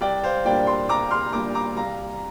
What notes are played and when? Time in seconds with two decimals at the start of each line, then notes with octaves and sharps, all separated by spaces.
0.01 C2 D5 G5
0.23 C5 F5
0.45 A#2 G3 A#3 D4 D5 G5
0.67 G5 C6
0.89 C2 A#5 D6
1.11 C6 F6
1.32 A#2 G3 A#3 D4 A#5 D6
1.55 A#5 D6
1.76 C2 F5 A#5